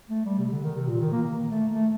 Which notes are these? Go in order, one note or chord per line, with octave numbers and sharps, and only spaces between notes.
A3
G3
C3
D3
D#3
C3
A#2
D#3
A#3
A3
A3